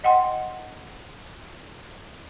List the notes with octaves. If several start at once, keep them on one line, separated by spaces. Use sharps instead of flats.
D#5 F#5 G5 C6